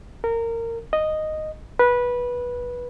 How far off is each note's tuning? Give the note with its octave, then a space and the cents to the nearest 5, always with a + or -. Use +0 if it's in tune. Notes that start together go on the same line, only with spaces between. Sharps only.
A#4 -20
D#5 -5
B4 -15